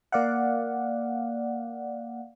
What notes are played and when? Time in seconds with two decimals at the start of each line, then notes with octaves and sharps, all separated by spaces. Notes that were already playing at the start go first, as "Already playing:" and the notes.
0.12 A#3 D5 F5 F#5